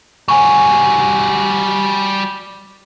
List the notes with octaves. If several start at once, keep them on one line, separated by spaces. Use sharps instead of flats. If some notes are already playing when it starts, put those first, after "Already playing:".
G3 F#4 G#5 C#6